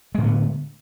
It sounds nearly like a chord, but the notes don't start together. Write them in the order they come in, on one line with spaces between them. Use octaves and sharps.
G#3 A2 D3 B3